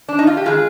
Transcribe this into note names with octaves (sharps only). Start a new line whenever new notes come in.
D4
D#4
F4
G4
D#3 G#3 F4 G#4